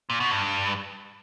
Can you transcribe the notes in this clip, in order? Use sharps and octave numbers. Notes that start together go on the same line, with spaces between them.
A#2
B2
G2